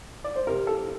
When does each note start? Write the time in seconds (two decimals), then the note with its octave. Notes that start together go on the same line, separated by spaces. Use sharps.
0.24 D5
0.36 C5
0.47 C3 A#4
0.67 A4